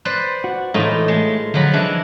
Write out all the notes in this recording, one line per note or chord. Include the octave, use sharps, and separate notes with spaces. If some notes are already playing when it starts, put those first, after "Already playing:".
B4 C5 D5
F#4
A2 E3 G#3 D#4 F4
G#3 A3 G#4 C#5
D3 F3 F#3 B5
E3 D4 G#4 D#5